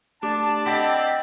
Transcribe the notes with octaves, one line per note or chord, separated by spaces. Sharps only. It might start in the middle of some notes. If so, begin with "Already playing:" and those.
A3 D4 G4 A5 D6
C4 G4 A4 D5 D#5 F#5 B5